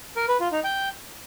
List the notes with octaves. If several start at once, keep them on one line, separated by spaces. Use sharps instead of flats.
A#4
B4
F4
D#4
G5